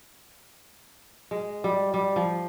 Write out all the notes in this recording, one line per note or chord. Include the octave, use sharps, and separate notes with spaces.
G#3
G3
G3
F3